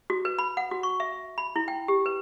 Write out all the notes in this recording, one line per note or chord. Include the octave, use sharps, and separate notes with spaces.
F#4
B4
B5
F#5
F#4
C#6
E5
B5
E4
G5
G4
B4